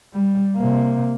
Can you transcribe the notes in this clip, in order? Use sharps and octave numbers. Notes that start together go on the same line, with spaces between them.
G3
C3 A#3